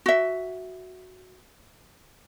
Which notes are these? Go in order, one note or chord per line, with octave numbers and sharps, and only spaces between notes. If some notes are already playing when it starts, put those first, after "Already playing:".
F#4 E5